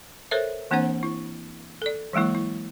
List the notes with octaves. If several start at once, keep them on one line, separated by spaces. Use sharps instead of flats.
A4 A#4 C5 C#5 E5
E3 A#3 C4 D4 C5 F#5
E4
A4 D5
E3 F#3 G#3 A#3 E4
E4